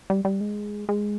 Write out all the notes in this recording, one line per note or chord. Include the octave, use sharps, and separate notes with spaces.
G3
G3
G#3
G#3